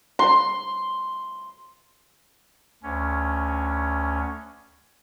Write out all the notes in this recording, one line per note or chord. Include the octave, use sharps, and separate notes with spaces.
C6
D2 C#4